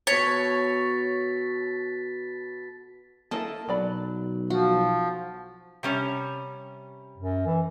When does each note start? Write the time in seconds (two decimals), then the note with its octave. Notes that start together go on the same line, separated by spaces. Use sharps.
0.07 B2 A4 C#5 A6 B6
3.31 A#3 E4 A4 D#5 A5
3.69 B1 F#3 D5 B5
4.50 F3 F#4
5.83 C3 G3 C#4
7.17 F#2
7.46 E3